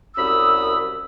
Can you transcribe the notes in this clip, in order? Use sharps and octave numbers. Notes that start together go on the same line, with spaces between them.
C2 F#2 B5 D#6 E6